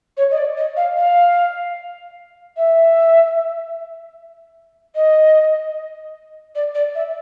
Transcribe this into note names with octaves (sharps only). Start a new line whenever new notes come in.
C#5
D#5
D5
D#5
F5
F5
E5
D#5
D5
D5
E5